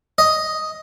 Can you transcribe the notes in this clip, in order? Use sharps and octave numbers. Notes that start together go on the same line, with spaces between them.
D#5